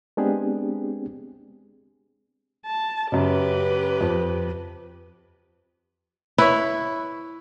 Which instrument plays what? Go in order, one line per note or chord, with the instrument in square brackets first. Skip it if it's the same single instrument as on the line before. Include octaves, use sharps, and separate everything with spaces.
[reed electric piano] G#3 B3 C4 D4 G4 G#4
[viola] A5
[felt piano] F#2 C#3 [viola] G4 B4
[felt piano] F2
[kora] E4 [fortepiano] B4 C#5